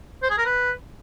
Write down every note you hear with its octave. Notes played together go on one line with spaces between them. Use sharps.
C5
G#4
A#4
B4